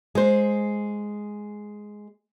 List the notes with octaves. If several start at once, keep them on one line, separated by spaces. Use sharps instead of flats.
G#3 C5